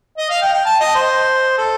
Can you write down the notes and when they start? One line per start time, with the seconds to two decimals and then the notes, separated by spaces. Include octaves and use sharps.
0.18 D#5
0.30 F5
0.42 G5
0.53 G5
0.65 A5
0.80 D#5
0.95 C5
1.58 A4